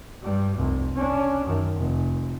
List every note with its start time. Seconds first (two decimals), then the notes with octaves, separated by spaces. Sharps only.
0.22 G2 G3
0.57 F1 C2
0.96 C#4 D4
1.46 F#2 D#3
1.77 F1